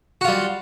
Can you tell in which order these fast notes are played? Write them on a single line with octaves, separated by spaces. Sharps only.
F#4 F4 G3